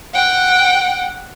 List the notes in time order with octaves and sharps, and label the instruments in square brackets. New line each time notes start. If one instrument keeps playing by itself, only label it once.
[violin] F#5 G5